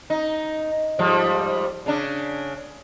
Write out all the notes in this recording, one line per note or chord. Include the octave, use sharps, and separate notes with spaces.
D#4
G#2 F3 G3
C#3 D4